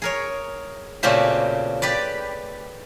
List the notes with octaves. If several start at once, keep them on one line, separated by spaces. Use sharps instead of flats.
G#4 A#4 C#5
A#2 C#3 A3 C4 F#4 G4
G4 B4 D5